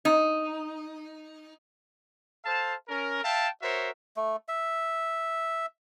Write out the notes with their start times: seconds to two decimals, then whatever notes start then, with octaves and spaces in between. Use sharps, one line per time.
0.05 D#4
2.44 A4 C5 F5 A5
2.87 C#4 A#4
3.23 E5 F5 G5 A5
3.61 F#4 A#4 C5 C#5 E5
4.16 A3
4.48 E5